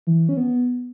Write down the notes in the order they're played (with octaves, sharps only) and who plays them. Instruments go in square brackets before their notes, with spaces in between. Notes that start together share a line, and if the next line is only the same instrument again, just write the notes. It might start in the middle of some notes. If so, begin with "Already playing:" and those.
[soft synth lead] E3
C#4
B3